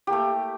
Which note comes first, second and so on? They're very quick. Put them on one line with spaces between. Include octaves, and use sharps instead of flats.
G4 A#3 A3